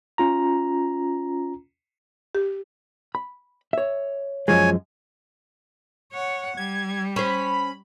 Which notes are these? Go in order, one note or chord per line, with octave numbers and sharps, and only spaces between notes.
C#4 F4 A#5
G4
B5
C#5 E5
F#2 F3 G#3 C#5 G#5
C#5 F#5
G3 G#6
C#4 C5 B5